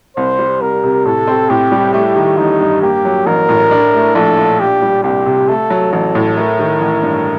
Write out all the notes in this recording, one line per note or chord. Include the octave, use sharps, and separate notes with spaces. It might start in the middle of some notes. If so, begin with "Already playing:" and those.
C2 C5
G3
C2 A#4
C3
A2 A4
C4
A2 G4
G3
A3 G4
D#3
A1 D#4
G2
A#3 G4
F#3
A1 A#4
A2
D4
A3
A#1 A4
A#2
D4 G4
G3
C2 G4
C3
A3 A4
F#3
A1 A4
A2
A3 A#4
D#3
A1
G2